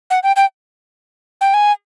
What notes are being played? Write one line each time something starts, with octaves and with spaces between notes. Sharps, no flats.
F#5
G5
G5
G5
G#5